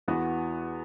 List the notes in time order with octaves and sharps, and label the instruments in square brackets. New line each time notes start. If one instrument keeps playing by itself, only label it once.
[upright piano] E2 E3 B3 F#4